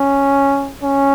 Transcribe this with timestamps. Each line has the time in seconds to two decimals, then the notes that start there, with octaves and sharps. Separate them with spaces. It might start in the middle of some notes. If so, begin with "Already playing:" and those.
Already playing: C#4
0.83 C#4